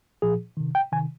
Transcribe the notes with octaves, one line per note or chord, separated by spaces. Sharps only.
A#2 F3 G#4
C3 D#3
G5
C3 D#3 G#5